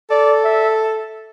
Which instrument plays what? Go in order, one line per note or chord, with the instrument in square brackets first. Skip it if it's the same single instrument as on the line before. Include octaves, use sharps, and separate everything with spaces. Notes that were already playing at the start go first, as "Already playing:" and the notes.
[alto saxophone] A4 [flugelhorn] D5
[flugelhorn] E5